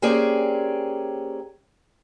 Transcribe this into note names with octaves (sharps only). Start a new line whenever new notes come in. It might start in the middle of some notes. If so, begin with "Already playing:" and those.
A#3 C4 C#4 G4 G#4 D5